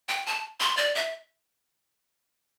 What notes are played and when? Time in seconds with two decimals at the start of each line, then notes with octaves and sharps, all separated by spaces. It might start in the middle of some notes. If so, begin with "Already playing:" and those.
0.09 G5
0.26 A5
0.60 C6
0.77 D5
0.95 E5